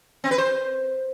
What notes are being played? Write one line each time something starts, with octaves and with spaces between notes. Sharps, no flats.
C4
B4
C5